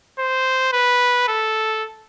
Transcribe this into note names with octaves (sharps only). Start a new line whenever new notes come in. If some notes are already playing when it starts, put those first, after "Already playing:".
C5
B4
A4